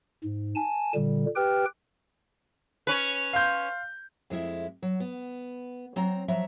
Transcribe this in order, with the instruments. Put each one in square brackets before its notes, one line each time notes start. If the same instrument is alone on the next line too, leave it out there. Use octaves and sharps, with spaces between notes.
[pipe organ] G#2
G#5 A5
A#2 D3 G3
G4 B4 G5 F6
[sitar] C#4 B4
[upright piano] F5 C6 G6
[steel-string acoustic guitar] F2 G#3 E4 E5
F#3
B3
F#3 C4 A#5
F3 F#3 E5 A#5